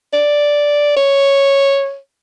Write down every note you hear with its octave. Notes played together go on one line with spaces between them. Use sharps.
D5
C#5